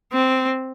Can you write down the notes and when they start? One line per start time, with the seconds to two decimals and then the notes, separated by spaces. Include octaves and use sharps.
0.13 C4